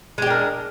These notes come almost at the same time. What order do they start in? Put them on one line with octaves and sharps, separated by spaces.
G#3 G4 D4 A#4